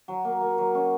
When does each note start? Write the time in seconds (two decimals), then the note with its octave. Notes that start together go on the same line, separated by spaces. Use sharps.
0.08 F#3
0.25 A#3
0.41 A#3
0.58 F#3
0.75 C#4